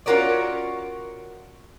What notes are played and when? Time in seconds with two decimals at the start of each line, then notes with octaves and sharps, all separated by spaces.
0.06 C#4 F4 F#4 A#4 C#5 D5